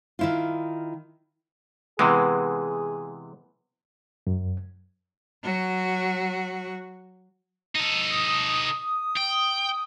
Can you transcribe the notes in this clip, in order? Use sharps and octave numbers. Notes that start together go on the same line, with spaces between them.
D#3 E4 F4
C3 E3 G#3 B3 G#4
F#2
F#3 F#4
D#4 A4
D#6
G5